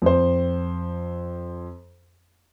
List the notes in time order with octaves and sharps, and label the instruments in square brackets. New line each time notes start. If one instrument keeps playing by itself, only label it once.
[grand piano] F2 C5